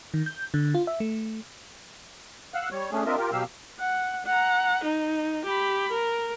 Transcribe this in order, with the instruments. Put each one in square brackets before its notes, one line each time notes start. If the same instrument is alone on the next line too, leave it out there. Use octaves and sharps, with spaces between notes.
[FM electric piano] D#3
G6
D3
F4
E5
A3
[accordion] F5 F#5 E6 F#6
G3 C#5
A3 C#4 D4 G#4
C4 D4 F4 A#4 D#5 E5
F4 G4 A#4
B2 F#3 G4 F5 E6
[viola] F#5
F#5 A#5
D#4
G4 B5
A#4